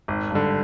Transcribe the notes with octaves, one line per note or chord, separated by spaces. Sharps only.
G#1
G2 D3